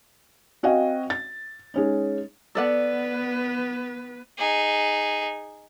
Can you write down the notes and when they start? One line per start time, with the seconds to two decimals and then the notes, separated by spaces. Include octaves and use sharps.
0.63 C4 F#4 D#5 F5 F#5 G#5
1.10 A6
1.74 G#3 C#4 D#4
2.55 B3 A4 B4 D5 F#5
4.38 D#4 G#4